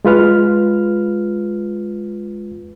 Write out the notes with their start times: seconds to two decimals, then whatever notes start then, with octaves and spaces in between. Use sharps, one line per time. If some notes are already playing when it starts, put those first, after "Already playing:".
0.05 G#3 F4 B4 F6